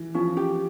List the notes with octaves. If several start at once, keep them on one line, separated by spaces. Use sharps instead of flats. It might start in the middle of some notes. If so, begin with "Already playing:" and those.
Already playing: E3
F3 C#4
G4